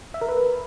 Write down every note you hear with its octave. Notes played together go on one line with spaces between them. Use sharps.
E5
A#4
B4